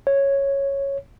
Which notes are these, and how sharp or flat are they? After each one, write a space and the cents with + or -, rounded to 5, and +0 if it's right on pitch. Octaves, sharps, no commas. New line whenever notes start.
C#5 -5